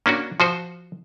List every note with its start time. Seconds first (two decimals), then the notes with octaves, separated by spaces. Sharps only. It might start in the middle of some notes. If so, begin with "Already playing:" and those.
0.06 A#3 C#4 D4 F#4
0.40 F3 F#4 C5